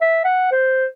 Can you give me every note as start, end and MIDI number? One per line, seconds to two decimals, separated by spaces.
0.02 0.20 76
0.25 0.48 78
0.51 0.87 72